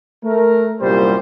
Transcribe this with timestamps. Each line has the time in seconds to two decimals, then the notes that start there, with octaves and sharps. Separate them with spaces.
0.24 A3 A#4
0.81 C2 F#2 A#2 G3 G4 C5